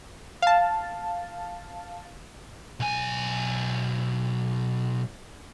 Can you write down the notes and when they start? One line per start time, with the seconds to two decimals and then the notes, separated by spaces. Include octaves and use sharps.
0.42 F5 A5
2.80 B1 G#5